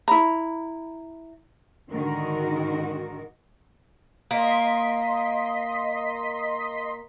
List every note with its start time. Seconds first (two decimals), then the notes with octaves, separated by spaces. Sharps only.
0.08 E4 A#5 B5
1.91 G#2 D3 D#3 F#4 A#4
4.31 A#3 D#5 C6 B6